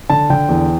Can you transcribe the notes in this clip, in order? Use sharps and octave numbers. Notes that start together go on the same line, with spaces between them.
D3 A5
D3 G5
E2